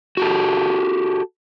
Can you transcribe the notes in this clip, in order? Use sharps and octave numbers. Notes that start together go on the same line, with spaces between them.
F#4 G4 A4